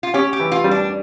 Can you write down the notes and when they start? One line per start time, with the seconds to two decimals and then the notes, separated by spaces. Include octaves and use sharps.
0.03 F4
0.14 C#4 G4
0.33 G4
0.40 E3
0.52 F4
0.64 G3
0.71 D4